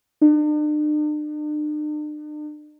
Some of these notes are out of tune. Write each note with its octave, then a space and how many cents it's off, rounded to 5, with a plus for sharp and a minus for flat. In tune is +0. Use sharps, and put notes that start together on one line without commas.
D4 +45